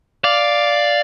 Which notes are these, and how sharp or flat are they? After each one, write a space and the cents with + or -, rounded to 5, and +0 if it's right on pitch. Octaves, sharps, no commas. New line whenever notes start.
D5 +0 F5 +0